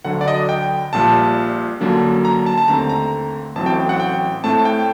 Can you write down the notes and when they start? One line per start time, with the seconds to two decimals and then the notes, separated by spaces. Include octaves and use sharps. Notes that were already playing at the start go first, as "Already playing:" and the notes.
0.04 D2 D3 F#3 F#5
0.21 D5
0.28 D#5
0.49 G5
0.93 A#1 A#2 G3 A5
1.80 F#2 D3 F#3 A#3 D4
2.25 A#5
2.46 A5
2.58 A5
2.68 D#2 D3 A3 C4 A#5
2.90 A#5
3.56 A1 A2 F#3 C4 A5
3.66 G5
3.89 F#5
4.00 G5
4.44 A2 A3 C4 A5
4.65 G5